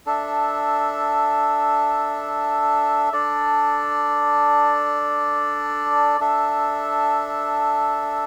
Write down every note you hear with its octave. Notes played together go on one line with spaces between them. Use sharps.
D4 A4 E5
D4 A4 D5
D4 A4 E5